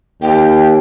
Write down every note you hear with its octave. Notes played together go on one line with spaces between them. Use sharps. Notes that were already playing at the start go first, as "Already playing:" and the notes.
D#2 G5